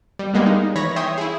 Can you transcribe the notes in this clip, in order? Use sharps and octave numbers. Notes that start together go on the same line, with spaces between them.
G3
G3 G#3 A#3 B3
D#4
E3 C#5 B5 C#6 A#6
C#5 E5 G5 G#5 C6 D#6
E4 G#4